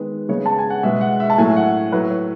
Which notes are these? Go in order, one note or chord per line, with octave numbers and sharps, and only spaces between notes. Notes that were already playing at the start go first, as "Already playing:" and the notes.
Already playing: D#3 G#3 B3 B4
C#3 G#3 B3 C#5
A5
G#5
F#5
B2 G#3 B3 E5
F#5
E5
A5
A2 F#3 A3 G#5
F#5
A2 F#3 A3 B4
C#5